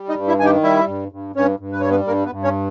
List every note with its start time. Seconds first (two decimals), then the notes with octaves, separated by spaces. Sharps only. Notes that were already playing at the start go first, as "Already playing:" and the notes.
Already playing: G3
0.09 D#4 D#5
0.16 G2
0.28 E4 E5
0.39 D#3 G#5
0.45 G4 G5
0.63 G3 E4 E5
0.88 G2
1.12 G2
1.36 G2 C#4 C#5
1.59 G2
1.72 B4
1.80 G3 C#5
1.90 B3 B4
2.07 G2 A#3 A#4
2.25 B3 B4
2.32 G2
2.44 C#4 C#5